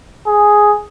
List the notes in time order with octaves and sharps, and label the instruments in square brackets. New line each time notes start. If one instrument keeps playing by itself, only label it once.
[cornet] G#4